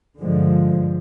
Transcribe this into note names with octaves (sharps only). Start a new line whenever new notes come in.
G2 D3 F3 G#3